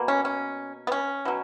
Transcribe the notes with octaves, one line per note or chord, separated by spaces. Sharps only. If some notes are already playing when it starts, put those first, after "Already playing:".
Already playing: B2 A#3
C#4
C#4
B3
C#4
B2 F#3